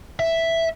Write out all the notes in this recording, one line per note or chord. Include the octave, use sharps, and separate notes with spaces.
E5